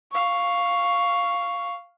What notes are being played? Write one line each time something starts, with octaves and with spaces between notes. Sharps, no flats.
F5 C#6